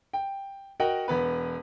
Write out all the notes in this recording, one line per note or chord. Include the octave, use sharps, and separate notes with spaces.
G5
F#4 A#4 D#5 F#5 G5
E1 B3 B4